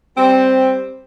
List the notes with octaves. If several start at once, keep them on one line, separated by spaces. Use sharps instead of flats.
G3 C4